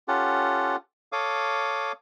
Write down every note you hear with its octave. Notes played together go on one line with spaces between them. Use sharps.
C#4 F4 G4 A4 F#5
A4 C#5 F5 D6 D#6